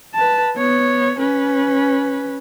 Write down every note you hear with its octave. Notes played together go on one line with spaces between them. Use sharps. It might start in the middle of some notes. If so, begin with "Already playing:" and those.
B4 A5
B3 C#5
C#4 B4